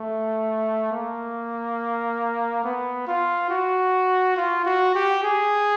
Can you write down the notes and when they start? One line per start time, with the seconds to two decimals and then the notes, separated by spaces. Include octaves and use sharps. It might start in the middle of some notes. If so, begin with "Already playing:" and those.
Already playing: A3
0.92 A#3
2.64 B3
3.08 F4
3.51 F#4
4.37 F4
4.65 F#4
4.95 G4
5.23 G#4